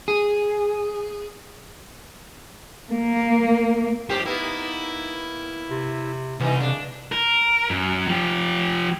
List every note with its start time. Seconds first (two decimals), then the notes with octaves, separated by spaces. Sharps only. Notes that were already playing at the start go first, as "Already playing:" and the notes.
0.08 G#4
2.92 A#3
4.10 G2 F3 G4 C5
4.26 A#3 B3 D#4 E4
5.71 C3
6.40 C2 E3 D#4
6.61 C#3 D4
7.12 A#4
7.70 F#2
8.07 F3 G4